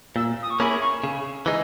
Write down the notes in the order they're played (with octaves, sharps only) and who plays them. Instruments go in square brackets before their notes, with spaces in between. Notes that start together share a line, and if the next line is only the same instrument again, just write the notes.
[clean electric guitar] A#2 [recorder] E6
[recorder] D#6
C#6
[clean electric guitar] A#3 C#4 E4 G#4 [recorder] B5
[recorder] C#6
[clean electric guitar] C#3
E3 G#3 D#4